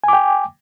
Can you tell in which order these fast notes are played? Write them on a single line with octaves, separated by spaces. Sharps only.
G#5 D6 G5